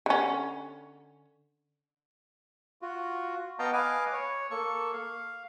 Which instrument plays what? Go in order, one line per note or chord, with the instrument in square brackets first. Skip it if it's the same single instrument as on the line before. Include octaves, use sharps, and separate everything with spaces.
[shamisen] D3 C#4
[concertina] F4 F#4
B3 D#5 F5 G5 A5 A#5
B4 D#5 F5 G#5 D6
C#5
A#3 A4 C#6
F5